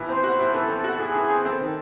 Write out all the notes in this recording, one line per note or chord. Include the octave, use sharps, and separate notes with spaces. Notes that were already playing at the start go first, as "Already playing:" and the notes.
Already playing: A2 E3
C4 C5
F#4
A2
E3 A4
C4
F#4
A2 G#4
E3
C4
C4 A4
C5
D#3 A4